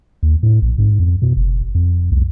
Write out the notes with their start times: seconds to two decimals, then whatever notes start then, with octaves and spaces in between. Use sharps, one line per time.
0.23 D#2
0.43 A2
0.62 A#1
0.78 G#2
1.00 F2
1.22 B2
1.37 F#1
1.75 F2
2.12 C2